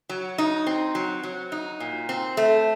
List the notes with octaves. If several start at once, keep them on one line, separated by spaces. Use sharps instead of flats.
F#3
D#4
C4
F#3
F#3
D#4
A#2
C4
A3